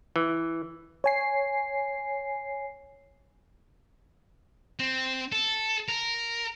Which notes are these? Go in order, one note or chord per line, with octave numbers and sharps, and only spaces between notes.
E3
C#5 G#5 C7
C4
A4
A#4